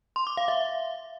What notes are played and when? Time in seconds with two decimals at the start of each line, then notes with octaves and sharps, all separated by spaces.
0.16 C6
0.27 D6
0.37 F5
0.48 E5